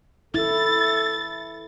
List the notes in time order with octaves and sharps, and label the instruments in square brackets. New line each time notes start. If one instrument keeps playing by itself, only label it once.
[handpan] E4 [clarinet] A4 [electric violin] A6